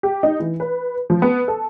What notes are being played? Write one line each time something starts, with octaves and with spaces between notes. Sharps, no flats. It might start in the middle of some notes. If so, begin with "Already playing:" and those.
G4
D#4
E3
B4
F3
B3
A4